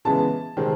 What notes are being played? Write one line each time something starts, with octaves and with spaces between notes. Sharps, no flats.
C#3 E3 G#3 B3 A5
C3 D#3 G#3 C4